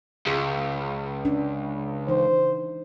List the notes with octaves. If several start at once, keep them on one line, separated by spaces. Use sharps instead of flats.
C#2 G#4
C#4 D4
E3 D#4 C5